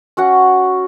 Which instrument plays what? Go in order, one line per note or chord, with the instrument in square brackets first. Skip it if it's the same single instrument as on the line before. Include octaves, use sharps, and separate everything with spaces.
[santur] C#4 F#4 F#5